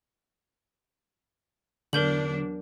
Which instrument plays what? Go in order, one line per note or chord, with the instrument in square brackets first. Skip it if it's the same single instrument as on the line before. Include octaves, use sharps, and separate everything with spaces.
[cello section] E2 F#3 D4 [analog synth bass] D3 [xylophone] A#4 G6 F#7